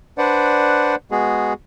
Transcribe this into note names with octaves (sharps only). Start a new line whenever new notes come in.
D4 B4 C5 D5 F#5
G#3 B3 F#4 G#4